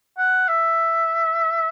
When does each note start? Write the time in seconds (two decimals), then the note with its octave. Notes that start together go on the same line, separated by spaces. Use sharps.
0.18 F#5
0.48 E5